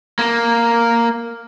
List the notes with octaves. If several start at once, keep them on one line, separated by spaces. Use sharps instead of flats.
A#3